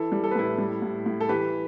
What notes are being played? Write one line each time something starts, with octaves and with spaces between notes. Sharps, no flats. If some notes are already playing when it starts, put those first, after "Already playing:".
Already playing: E3 E4 A4
G3
A4
B4
A2 E4 A4
G3
A2
A2
A4
E3 G4 B4